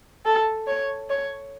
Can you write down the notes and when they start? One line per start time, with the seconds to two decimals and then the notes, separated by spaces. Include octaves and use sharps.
0.25 A4
0.67 C#5
1.10 C#5